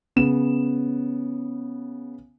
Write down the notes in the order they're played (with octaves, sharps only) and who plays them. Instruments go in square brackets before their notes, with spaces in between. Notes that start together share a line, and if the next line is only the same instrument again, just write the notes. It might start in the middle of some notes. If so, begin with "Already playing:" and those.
[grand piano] C#3 B3 E7